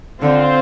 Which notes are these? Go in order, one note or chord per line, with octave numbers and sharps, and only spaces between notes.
D3 C4 F4 C5